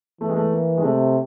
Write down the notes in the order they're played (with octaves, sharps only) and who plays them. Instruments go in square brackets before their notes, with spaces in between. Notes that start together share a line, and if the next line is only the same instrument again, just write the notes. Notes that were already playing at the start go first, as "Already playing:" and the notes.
[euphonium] E3 [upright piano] A3
[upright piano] G#3
A3
A#3
G#3
[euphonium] C3 [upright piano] A3